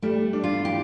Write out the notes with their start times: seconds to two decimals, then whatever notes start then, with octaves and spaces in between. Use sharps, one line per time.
0.02 G3 A3
0.33 D4
0.44 F4
0.65 E3 G4